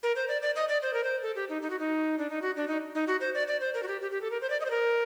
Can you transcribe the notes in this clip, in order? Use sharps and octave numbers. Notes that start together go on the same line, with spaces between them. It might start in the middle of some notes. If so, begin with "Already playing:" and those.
A#4
C5
D5
D5
D#5
D5
C5
A#4
C5
A4
G4
D#4
D#4
F#4
D#4
D4
D#4
F#4
D4
D#4
D#4
F#4
C5
D5
D5
C5
A#4
F#4
G4
G4
G4
A4
A#4
C5
D5
D#5
C5
A#4